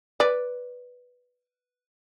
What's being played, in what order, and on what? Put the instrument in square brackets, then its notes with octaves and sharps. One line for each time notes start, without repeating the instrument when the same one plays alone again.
[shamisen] B4 D5